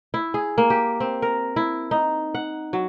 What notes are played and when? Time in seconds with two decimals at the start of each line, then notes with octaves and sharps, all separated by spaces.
0.14 E4
0.34 G#4
0.58 A#3
0.70 G4
1.00 C4
1.22 A#4
1.56 E4
1.91 D#4
2.35 F#5
2.73 F#3